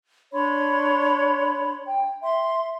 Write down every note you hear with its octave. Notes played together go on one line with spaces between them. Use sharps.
D4 C#5 B5 C6
G5
E5 C6